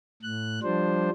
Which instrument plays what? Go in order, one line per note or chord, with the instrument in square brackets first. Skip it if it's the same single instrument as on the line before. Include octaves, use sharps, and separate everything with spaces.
[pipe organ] A2 F#6
F3 G3 D4 C5